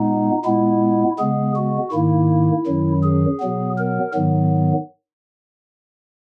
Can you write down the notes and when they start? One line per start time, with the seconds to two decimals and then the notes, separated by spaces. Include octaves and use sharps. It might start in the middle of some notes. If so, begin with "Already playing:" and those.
Already playing: A#2 G#3 B3 D#4
0.45 A#2 G#3 B3 E4
1.19 C#3 G#3 B3 G#4
1.56 F#4
1.92 G#2 D#3 A#3 E4
2.66 F#2 D#3 F#3
3.03 G#4
3.40 B2 F#3 B3
3.77 A#4
4.14 G#2 D#3 F#3 B3